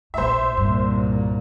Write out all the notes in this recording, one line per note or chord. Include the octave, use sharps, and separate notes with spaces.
A#1 A3 C5 E5
C2 G2 A#2